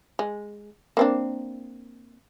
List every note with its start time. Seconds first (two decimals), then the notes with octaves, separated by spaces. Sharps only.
0.19 G#3
0.97 A#3 C4 D4